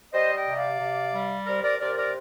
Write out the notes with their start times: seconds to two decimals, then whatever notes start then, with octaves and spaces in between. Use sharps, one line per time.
0.13 G3 C5 D#5
0.35 D#5 G5
0.47 C3
0.57 D5 F5
0.79 C3
1.13 G3
1.46 C3 A#4 D5
1.63 A#4 D5
1.80 C3 A#4 D5
1.96 A#4 D5